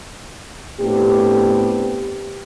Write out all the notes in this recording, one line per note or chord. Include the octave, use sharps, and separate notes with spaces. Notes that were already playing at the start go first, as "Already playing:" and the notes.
A2 B3 C4 D4 G4